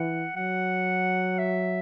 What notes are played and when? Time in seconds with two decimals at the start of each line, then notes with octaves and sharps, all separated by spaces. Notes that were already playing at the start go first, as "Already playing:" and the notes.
Already playing: E3 F#5
0.36 F#3 F#5
1.39 E5